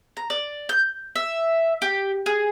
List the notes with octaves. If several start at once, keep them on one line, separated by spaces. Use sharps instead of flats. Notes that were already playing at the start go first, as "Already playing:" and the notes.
A#5
D5
G6
E5
G4
G#4